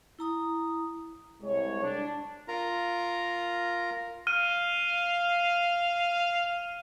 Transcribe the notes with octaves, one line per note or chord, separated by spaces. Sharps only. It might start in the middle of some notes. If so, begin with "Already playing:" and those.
E4 A#5 D#6
C2 G#3 C#5
D4
F4 A#4 A#5
F5 F6 D#7